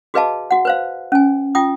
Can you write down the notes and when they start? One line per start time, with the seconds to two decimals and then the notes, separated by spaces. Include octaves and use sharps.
0.14 F#4 G#4 B4 D#5 F5 A5
0.51 F#4 F#5
0.65 B4 C5 F5
1.12 C#4 G#5
1.55 F4 G5 D#6